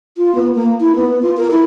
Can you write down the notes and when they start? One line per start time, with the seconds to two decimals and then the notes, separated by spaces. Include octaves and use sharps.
0.17 F4
0.35 B3
0.55 A#3
0.81 E4
0.96 B3
1.23 F4
1.37 A#4
1.51 E4